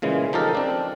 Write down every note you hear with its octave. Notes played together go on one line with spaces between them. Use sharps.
A#2 C#3 E3 G#3
F3 D#4 G4 A4 A#4
C4 D4